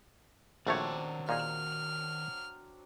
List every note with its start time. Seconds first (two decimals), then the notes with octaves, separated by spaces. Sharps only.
0.67 A#1 D#3 F#3 A3 C4 D4 C#5 D5
1.29 A#2 D#4 G#4 F6